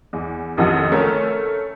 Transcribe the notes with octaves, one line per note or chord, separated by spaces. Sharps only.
E2
A1 F2 C3 D#3 F3 F#5
A3 C#4 A4 A#4